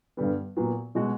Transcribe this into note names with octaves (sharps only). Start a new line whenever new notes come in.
G2 D3 G3 B3
A#2 F#3 B3
B2 G#3 C#4 F#4